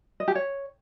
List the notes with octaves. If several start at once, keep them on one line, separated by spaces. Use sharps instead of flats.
D#5
G4
C#5